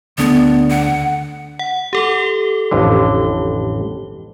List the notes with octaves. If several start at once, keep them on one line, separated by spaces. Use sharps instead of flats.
D2 B3 D4 A4
F#5
F#5
G4 A4 G7
A1 F2 D3